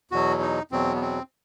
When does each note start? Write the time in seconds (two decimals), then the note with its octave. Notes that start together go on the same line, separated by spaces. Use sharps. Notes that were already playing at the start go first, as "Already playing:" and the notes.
0.11 E2 B2 F#3 F#4
0.41 D#4
0.71 E2 B2 F#3 C4
0.95 B3
1.01 C4